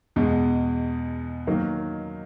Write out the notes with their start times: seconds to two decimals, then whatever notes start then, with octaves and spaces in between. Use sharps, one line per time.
0.16 E2 B2 G#3
1.47 D#3 F#3 A#3 D#4